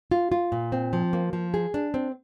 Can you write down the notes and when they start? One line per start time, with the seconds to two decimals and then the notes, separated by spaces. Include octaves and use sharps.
0.11 F4
0.32 F4
0.52 A#2
0.72 C4
0.93 F3
1.13 A#3
1.33 F3
1.54 G#4
1.74 D4
1.94 C4